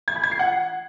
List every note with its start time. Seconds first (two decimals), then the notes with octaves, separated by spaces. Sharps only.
0.08 G#6
0.16 B5
0.23 G#6
0.31 C7
0.39 F#5